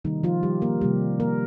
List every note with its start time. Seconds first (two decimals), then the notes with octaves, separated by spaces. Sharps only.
0.04 C3 D#3 G3 A#3 D#4
0.23 F3 F4
0.43 G3 G4
0.62 A#3 A#4
0.81 C3 D#3 G3 A#3 G4
1.20 A#3 A#4